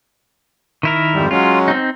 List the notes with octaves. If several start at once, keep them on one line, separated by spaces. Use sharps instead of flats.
D#3 E4 A#4
F2 G#2 G3
F#3 G#3 C#4 F4
C4 D#4